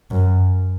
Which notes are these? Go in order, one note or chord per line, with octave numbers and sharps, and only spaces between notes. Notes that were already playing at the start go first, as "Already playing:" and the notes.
F#2